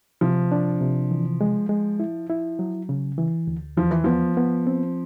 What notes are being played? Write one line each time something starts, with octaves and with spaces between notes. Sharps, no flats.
C3 F3
D4
C3
E3
G#3
G#3
E4
E4
F#3
C#3
E3
D2
E2 F3
E3
F3 B3
B3
C4